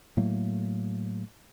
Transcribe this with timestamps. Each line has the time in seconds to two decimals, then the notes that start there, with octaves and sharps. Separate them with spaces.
0.17 A2 F#3 A3 A#3